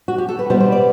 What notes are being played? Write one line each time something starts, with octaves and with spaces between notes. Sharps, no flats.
F#4
G4
A4
B4
B2 G3 B3 C5
C5
D5